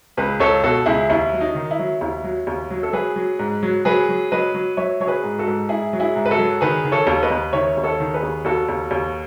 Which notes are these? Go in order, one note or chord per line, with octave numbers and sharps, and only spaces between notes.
C#2 G#4 B4
C#2 A4 C#5
B2 F#4 A4
C#2 E4 G#4
D#2 E4
F#3
D#4
D#3
E4
F#3
D#2 E4
F#3
D#2
F#3
A4
F#3 G#4 B4
F#3
G#2
F#3
F#3 G#4 B4
F#3
F#3 B4 D#5
F#3
F#3 C#5 E5
F#3 C#5
G#4 B4
G#2
F#4 A4
G#2
G#2 E4 G#4
F#3
E4 G#4
G#2
B4
F#4 A4
F#3
D#3 G#4 B4
D#3
A4 C#5
D#2
B4 D#5
D#2
D#3 C#5 E5
D#2
A4 C#5
D#3
G#4 B4
D#2
D#2 F#4 A4
D#2
D#2